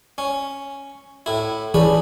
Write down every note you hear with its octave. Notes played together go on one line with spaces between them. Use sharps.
C#4
A2 E4
E3 C#4 D4 G#4 B4